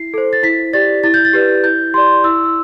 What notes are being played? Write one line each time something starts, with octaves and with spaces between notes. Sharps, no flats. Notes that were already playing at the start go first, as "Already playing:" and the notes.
Already playing: E4 C7
A4 C5
A6
E4 B6
G4 D5 A6
E4 A6
G6
A6
G4 B4 D5
E4 G6
G4 D5 C6
E4 E6
E6